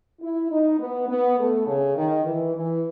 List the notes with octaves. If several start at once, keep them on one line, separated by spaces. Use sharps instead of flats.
E4
D#4
B3
B3
A3
C#3
D#3
E3
E3